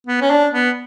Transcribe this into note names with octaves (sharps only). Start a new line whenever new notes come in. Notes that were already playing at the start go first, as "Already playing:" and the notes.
B3
C#4
D4
B3